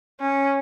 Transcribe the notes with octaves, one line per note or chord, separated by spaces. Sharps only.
C#4